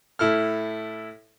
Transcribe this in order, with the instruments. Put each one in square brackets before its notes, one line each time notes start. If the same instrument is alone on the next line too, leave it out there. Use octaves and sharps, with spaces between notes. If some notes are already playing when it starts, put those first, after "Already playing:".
[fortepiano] A2 E4 A4 F6